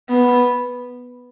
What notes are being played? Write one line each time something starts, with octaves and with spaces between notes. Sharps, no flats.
B3